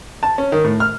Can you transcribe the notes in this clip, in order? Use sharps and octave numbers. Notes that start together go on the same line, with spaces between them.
A5
C#4
D#3
A2
F6